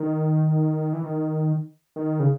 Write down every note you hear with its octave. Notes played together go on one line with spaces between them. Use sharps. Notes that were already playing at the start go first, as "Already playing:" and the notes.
Already playing: D#3
E3
D#3
D#3
C#3